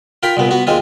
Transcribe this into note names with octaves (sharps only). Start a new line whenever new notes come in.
F4 A#4 G5 B5
C2 A#2 B3
B3 F#4
D#2 G#3 C4 F4